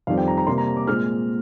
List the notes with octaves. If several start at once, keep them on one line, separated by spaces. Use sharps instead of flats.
F2 D#3 G3 C4 F5
G5
A#5
A#5
C3 G3 A#3 C6
A#5
D6
A#2 G#3 C4 F6